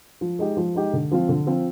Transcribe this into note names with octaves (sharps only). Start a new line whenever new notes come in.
F3
G#3 D#4 G4
F3
G#3 D#4 G4
D3
F3 C4 F4
D3
F3 C4 F4